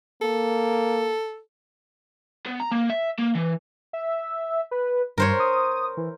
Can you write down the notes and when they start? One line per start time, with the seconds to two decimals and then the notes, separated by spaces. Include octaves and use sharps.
0.22 A#3 A4
2.46 B3
2.60 A#5
2.72 A#3
2.90 E5
3.19 A#3
3.35 E3
3.93 E5
4.71 B4
5.18 G2 A#4 C5 C#5
5.40 D#6
5.97 E3